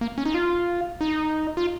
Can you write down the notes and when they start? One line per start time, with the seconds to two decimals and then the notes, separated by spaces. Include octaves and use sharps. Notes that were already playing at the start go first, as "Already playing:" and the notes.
0.01 A#3
0.18 C#4
0.26 D#4
0.34 F4
1.01 D#4
1.57 F4